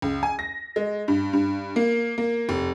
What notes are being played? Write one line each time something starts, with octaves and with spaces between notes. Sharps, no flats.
C#2
G#5
A#6
G#3
G2
G2
A#3
A#3
F1